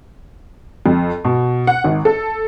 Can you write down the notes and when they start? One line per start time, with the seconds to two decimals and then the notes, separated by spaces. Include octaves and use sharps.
0.86 F2
1.25 B2
1.67 F#5
1.84 G#1
2.05 A4